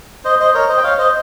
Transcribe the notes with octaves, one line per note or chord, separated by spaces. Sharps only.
C5 D#5
C5 D#5
A#4 C#5
C5 D#5
G5
C#5 F5
C5 D#5